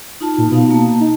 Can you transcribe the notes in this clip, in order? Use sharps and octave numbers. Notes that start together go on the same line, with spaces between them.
D#4 F4 A5
A#2
B2 B3 D#4 F5
A#3 A5
D#4